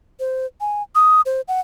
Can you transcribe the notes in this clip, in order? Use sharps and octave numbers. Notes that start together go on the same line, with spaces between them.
C5
G#5
D#6
C5
F#5